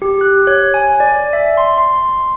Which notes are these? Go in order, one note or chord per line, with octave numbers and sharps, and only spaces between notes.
G4
F#6
C#5
G#5
D5
E5
C6
C6